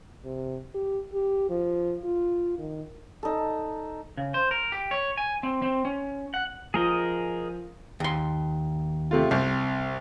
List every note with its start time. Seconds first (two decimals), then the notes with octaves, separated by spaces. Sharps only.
0.25 C3
0.74 G4
1.13 G4
1.50 F3
2.04 F4
2.59 D#3
3.23 D#4 A4
4.17 C#3
4.34 C5
4.51 A#4
4.72 G4
4.91 C#5
5.17 G#5
5.43 C4
5.62 C4
5.85 C#4
6.34 F#5
6.74 F3 G#4 A#4 D#5
8.00 D#2 C6
9.11 C3 A3 F4
9.31 C2 C4